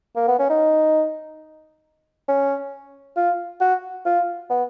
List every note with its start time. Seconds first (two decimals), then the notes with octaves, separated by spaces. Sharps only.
0.16 A#3
0.28 B3
0.39 C#4
0.50 D#4
2.28 C#4
3.16 F4
3.61 F#4
4.06 F4
4.50 B3